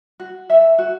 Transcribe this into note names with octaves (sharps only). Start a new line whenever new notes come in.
F#4
A4 E5
F#4